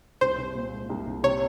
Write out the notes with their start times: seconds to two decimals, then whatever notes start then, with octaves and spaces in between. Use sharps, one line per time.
0.21 C2 C5
0.38 C2
0.55 A#2
0.72 G#3
0.90 C2
1.06 C2
1.23 C3 C#5